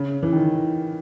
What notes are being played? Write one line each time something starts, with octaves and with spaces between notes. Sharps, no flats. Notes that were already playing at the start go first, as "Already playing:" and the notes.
Already playing: C#3
E3
D#3